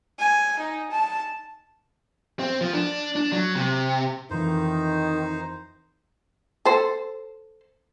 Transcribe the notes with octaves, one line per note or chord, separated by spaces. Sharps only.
G#5
D#4
A5
C4
F3
D4
D4
F#3
C3
F2 D#3 E3 D#4 C5
A4 C5